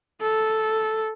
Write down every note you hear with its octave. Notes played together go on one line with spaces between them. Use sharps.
A4